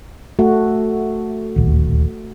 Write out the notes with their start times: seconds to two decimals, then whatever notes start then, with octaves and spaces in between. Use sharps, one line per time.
0.39 A3 F#4
1.56 D1 A#1 D#2